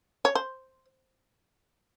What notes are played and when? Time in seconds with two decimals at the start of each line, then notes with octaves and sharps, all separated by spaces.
0.25 C#5
0.35 C5